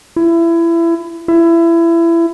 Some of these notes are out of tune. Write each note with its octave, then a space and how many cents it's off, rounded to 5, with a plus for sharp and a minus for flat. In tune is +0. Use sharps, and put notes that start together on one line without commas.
E4 +25
E4 +25